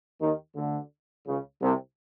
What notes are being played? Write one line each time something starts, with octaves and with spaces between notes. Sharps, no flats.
D#2 D#3
D2 D3
C#2 C#3
C2 C3